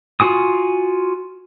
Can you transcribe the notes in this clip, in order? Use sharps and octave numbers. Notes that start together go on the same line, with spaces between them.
F4 F#4 G#5 D#6